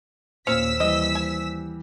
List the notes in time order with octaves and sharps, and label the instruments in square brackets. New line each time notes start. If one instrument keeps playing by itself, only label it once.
[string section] D#2 E6 B6 [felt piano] A#2 [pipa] C#4 [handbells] C5
[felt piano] E3 G3 [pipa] D#5
[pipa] G#5